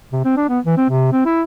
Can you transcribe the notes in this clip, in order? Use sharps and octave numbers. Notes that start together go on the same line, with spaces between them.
C3
C4
D4
B3
E3
C4
C3
C4
E4